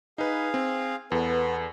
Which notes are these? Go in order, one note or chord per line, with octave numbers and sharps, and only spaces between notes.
D#4 G#4 B4 F5
C4
E2 B3 A4 B4